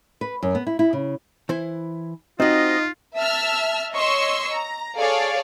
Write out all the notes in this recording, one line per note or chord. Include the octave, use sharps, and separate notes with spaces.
B4
F#2
B3
E4
E4
C#3
E3 E4 C5
C4 D#4 F4 F#4 D#5
E5 A5 E6 F6
C#5 D#5 C6 C#6 E6
A#5
G#4 A4 C#5 D5 F5